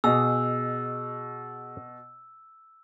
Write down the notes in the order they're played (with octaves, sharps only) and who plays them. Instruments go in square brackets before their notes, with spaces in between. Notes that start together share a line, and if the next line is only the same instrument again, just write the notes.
[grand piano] B2 [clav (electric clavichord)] G#4 D#5 [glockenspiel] E6